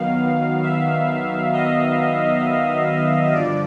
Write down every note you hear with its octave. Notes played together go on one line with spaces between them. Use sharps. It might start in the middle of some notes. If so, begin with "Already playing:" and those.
Already playing: D#3 F#3 B3 F5
E5
D#5
G2 D3 F3 D5